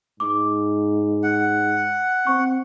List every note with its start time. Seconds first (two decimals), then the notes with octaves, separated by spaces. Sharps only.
0.20 G#2 D6
1.23 F#5
2.27 C4 C#6